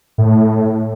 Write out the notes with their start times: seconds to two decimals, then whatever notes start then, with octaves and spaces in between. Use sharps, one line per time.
0.18 A2